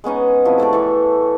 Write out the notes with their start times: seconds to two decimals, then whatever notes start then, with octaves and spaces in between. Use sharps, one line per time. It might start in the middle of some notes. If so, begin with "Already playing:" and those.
0.04 G#3 B3 C#4 D#4
0.45 C3 F3 E4 F#4
0.58 A2 A3 D5 D6
0.73 E3 A4 C#5